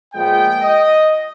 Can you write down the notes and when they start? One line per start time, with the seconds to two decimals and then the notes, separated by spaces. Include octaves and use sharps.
0.14 A#2 F3 G#3 B3 G5
0.61 D#5